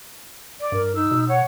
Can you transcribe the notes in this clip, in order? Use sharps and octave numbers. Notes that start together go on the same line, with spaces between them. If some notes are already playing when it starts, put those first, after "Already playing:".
D5
G2 A#4
D#4 E6
B2
C#5 F#5